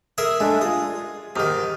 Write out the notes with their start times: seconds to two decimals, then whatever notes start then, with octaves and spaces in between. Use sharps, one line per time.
0.18 G#4 A#4 E5
0.40 G#3 A3 D4
0.62 F4 G#4 D#5
1.36 G#2 D#3 G4 D#6 F6